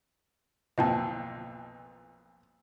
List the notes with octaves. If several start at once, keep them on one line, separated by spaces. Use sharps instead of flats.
B1 F2 A#2 D#5 G5 A5